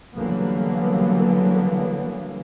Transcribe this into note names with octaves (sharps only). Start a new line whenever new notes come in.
D3 E3 F#3 G3 A#3 B3